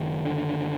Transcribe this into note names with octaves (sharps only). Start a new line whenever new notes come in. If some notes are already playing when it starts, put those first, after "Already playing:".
Already playing: F#1 D#3
D3